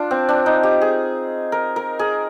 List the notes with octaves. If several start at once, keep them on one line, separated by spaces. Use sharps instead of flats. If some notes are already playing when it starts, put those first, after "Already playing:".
Already playing: D4 F4
C4
D4
D#4
G4
G#4
A#4
A#4
G#4